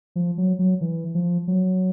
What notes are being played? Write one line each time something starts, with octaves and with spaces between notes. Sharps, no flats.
F3
F#3
F#3
E3
F3
F#3